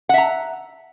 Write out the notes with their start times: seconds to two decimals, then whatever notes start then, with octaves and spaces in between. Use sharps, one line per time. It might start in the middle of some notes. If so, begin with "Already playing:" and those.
0.09 F#5
0.14 E5
0.18 A#5